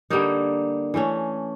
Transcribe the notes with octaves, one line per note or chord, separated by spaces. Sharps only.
D3 G3 A#3 D#4
E3 A3 C#4